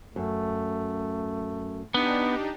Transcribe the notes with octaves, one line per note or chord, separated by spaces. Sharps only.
F#2 A3
B3 D4 D#4 G4